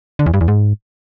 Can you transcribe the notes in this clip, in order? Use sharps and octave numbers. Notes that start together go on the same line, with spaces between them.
D3
E2
G2
E2
G#2